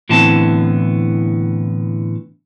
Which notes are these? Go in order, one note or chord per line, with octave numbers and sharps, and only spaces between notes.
A2 D3 E3 B3 C4 A5